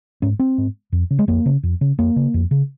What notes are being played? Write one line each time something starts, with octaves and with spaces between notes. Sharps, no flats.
G#2 C#4
C4
G#2
F2
C#3
G#3
F2 A#3
C#3
F2
C#3
F2 A#3
C#3
F2
C#3